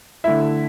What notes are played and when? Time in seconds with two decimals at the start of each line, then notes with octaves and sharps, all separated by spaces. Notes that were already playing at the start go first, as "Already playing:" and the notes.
0.24 D3 A3 E4 E5